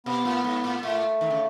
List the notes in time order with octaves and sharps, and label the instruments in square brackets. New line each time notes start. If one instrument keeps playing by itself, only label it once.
[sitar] B2 [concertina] B3
[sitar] A2
G#2
A2
[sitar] A2 [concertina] A3
[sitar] D#3
C#3